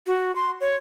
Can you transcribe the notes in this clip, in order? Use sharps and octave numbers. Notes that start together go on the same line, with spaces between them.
F#4
C6
C#5